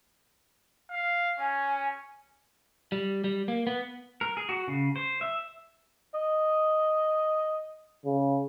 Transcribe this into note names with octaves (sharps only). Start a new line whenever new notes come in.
F5
C#4 G#5
G3
G3
A#3
B3
A#4
G#4
F#4
C#3
C5
E5
D#5
C#3